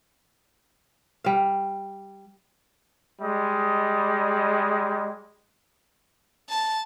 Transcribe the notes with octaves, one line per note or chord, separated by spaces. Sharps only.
G3 F5
G3 G#3 D#5
A5